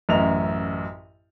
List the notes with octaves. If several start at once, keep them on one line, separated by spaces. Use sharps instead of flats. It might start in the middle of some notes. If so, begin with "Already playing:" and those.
A1 F#2 F7